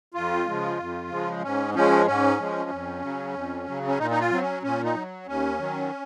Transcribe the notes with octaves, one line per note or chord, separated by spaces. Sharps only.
F2 F4
C#3 F3 G#3
F2
C#3 F3 G#3
G#2 C#4
F3 G#3 C#4
G#2 C#4
F3 G#3
F2
C#3 F#3
F2
C#3 F#3
C#4
A#2 D#4
D#4
F4
F#3 C4
C#4
A#2 C#4
D#4
F#3
D#2 C#4
D#3 F#3